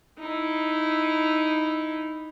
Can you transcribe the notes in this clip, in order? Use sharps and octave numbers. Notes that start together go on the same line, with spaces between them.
D#4 E4